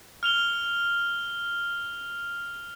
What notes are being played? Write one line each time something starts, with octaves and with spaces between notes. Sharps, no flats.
F6 F7 G7